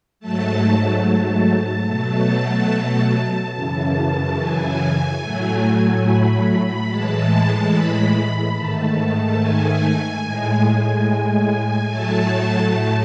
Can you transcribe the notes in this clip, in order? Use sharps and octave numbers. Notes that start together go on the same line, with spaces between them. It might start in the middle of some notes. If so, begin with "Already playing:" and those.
G#2 F#3 A3 A5
A5
B2 F#3 A3 A5
F#2 C#3 E3 A5
G#5
A2 F#3 A3
B5
A2 E3 G#3 A5
B5
G#2 D#3 A3 A5
G#5
A2 G#3
A2 F#3 A3 A5
A5